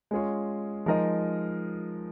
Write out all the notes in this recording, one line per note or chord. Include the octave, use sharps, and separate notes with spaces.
G#3 C#4 F4 G#4 C#5
F3 G#3 D#4 A#4 D#5